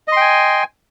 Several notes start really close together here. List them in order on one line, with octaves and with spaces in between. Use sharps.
D#5 C6 G5 G#5